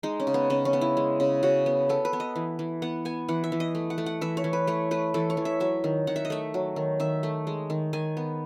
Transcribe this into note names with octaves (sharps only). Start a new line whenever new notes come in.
G#3 D#4
C#4
C#3
B3
C#3 C#4
C#4
B3
E4
G#3
C#3
C#3 F#4
B3
B3 A4
B4
B3
D#5
E3
E3
B3 F#5
B3 G#5
E3 F#5
E5
E3
D#5
A3
F#5
A3
F#5
E3 E5
C#5
E3
B4
A3 C#5
A3 B4
E3 A4
C#5
E3
E5
F#3 E5
D#3
D#3 F#5
E5
D#5
A3 E5
F#3
D#3
D#3 E5
A3
G#3
D#3
D#3 G#5
B3